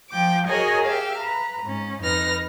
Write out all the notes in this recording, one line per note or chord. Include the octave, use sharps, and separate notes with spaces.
F3 G5 D6
F#4 G#4 A#4 C#5 D#5 G#5
G4 E5 F5 G5
B4 A#5
G#2 C#4
F2 D#4 B4 F6 A#6